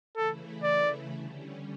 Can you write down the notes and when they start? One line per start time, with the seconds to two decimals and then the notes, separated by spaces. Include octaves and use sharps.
0.16 C#3 E3 A3 E4 A4
0.63 D5
1.11 D3 G3 C#4